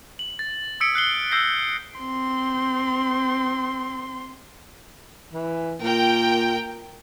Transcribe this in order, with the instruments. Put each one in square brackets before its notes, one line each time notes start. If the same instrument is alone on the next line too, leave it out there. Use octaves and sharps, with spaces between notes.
[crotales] F#7
A6
D#6 E6 G#6 B6 C#7 D7
F6 F#6 B6 C7 F#7 G7
E6 G6 A#6 C7
[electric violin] C4 C6
[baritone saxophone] E3
[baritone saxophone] A#2 [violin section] A#4 G5